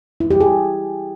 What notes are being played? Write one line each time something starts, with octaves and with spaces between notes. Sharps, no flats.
E4
G4
G#4